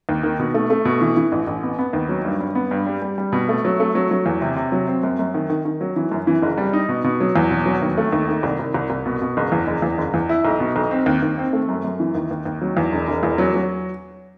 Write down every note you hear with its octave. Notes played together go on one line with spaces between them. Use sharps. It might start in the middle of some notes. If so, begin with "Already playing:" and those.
D#2
D#3
B2
A3
A3
B2
E3
E3
A1
A1
B3
B3
D#2
F#3
G2
G2
B3
G2
G3
G3
G3
B2
A3
F#3
A3
F#3
F#3
E2
C3
C3
F#3
C4
F#2
F#2
D#3
D#3
D#3
F#3
E3
F#2
E3
F#1
G3
D#4
B2
B2
F#3
E2
B2
F#3
D#2
A3
D#2
D#3
C2
C2
C2
C2
B2
B2
F#1
E2
F#1
E2
F#1
E2
E4
B1
B2
B1
C4
D#2
D#2
C4
A3
F#2
F#2
E3
D#2
D#2
D#2
F#3
E2
E1
E1
E2
F#3
F#3